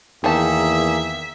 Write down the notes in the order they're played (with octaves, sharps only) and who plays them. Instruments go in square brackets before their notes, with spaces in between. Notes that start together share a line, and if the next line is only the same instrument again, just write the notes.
[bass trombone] E2 [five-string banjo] D#3 A5 [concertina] A#3 G#4 [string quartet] E5